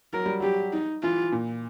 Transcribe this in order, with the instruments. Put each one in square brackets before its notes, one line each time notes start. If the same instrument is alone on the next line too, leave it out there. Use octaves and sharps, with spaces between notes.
[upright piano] F#3 [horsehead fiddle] A#4
[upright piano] G3
[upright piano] F#3 [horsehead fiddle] G4
[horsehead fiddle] D#4
[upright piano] E3 [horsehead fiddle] F4
[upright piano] A#2